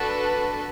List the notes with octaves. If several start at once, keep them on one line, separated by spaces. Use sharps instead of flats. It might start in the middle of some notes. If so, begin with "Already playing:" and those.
Already playing: D4 F#4 A4 B4